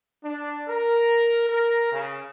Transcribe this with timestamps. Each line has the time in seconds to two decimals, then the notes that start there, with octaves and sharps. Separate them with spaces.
0.24 D4
0.68 A#4
1.48 A#4
1.92 C#3